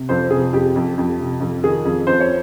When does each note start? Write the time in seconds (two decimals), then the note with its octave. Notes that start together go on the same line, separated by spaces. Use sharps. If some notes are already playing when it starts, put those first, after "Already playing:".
Already playing: C3
0.09 F2 C5
0.30 C3 G#4
0.53 F2 G4
0.76 F2
0.98 F2
1.19 C3
1.41 F2
1.64 D#3 G#4
1.85 F2
2.07 F2 C5
2.20 C#5